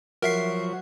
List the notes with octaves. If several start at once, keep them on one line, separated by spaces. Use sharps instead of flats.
F3 F#3 F#4 A#4 E5 C7